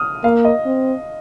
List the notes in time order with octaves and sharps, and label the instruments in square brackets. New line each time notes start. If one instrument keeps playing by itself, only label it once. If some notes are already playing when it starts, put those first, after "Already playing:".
Already playing: [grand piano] D#6 F6
[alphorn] A#3 [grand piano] F5
[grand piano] D#5
[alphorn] C4